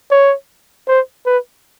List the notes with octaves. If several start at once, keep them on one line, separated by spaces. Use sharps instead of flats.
C#5
C5
B4